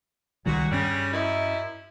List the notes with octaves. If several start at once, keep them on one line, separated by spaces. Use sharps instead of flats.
C#2 A#2 D#3 G3 F#4
G2 C#3 G3 C#4
F#2 D#4 E4